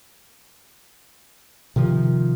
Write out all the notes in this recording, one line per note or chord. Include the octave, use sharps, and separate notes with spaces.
C3 D#3 F3